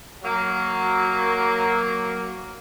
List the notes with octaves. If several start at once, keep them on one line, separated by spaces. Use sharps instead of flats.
F#3 A#3